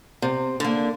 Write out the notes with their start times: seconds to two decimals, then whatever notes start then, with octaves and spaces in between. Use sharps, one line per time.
0.22 C3
0.60 D3 A#3